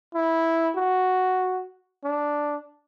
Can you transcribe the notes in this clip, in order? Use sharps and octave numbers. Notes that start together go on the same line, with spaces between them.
E4
F#4
D4